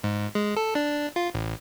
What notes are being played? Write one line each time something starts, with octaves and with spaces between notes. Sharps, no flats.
G#2
G#3
A4
D4
F4
A1